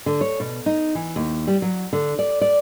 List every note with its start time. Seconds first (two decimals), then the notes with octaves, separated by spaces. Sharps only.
0.06 D3
0.21 C#5
0.40 B2
0.66 D#4
0.95 E3
1.16 D#2
1.47 G3
1.62 F#3
1.93 D3
2.19 D5
2.41 D5